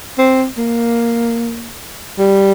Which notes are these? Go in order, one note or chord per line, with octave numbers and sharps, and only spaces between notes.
C4
A#3
G3